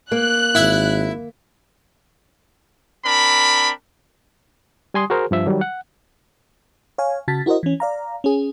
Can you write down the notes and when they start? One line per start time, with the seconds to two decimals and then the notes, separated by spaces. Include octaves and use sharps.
0.12 A#3 F#6
0.55 G#1 E4 E5
3.05 C4 D4 A#4 B5
4.94 G3 G#5 C6 D#6
5.10 F#4 G#4 A#4 C5
5.31 G2 F3 E5
5.46 D#3 F#3 G3
5.61 F#5
6.98 C#5 F5 G#5
7.28 C#3 F#4 A5 A6 B6
7.46 E4 F#4 A#4 C5 D#5
7.63 E3 C#4
7.80 D5 F5 A#5
8.24 C#4 G#4